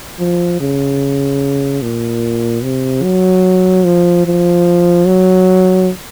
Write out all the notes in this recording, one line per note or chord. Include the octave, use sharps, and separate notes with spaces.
F3
C#3
A#2
C3
F#3
F3
F3
F#3